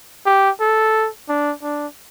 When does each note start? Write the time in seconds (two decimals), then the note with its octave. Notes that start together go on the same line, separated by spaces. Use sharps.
0.26 G4
0.60 A4
1.29 D4
1.63 D4